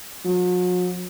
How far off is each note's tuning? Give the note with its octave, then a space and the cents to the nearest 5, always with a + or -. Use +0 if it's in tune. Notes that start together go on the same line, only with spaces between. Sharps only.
F#3 -45